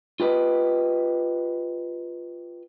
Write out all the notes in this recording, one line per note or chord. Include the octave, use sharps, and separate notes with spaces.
F4 G4 B4 D#5